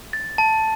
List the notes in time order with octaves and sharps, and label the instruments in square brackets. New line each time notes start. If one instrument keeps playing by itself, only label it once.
[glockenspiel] A6
A5